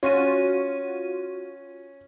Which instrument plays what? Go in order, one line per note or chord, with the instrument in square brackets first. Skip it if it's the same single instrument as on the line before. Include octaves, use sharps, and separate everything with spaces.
[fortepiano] C#4 [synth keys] F4 F#4 D#7